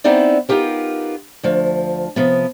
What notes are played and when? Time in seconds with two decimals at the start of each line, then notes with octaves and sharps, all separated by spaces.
0.04 B3 C4 D#4 E4 D5
0.49 B3 D#4 F4 G4 A#4
1.43 D2 F3
2.16 C3 F3 B3